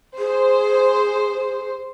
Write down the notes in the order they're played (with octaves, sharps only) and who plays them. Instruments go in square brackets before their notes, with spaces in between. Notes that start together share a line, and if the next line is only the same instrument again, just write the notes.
[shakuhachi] G#4 [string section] C5